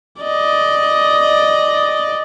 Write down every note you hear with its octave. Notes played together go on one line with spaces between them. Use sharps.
D5 D#5